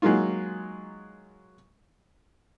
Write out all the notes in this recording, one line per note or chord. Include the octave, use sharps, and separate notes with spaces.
F#3 G#3 A#3 D#4 F4